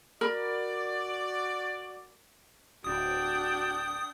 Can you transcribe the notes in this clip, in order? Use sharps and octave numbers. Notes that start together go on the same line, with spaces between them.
F#4 A#4 D5 B5
D1 D4 F#4 G5 D#6